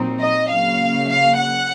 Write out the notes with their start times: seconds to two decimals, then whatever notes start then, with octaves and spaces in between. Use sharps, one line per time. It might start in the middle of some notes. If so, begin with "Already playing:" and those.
Already playing: A#2 F#3 C4 D#4
0.21 D#5
0.50 C#3 F#3 A#3 F5
1.08 F5
1.37 F#5